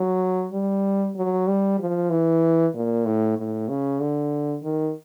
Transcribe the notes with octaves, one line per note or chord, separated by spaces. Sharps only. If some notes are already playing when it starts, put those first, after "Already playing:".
Already playing: F#3
G3
F#3
G3
F3
E3
A#2
A2
A2
C#3
D3
D#3